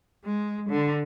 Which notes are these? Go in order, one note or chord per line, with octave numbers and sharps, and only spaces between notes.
G#3
D3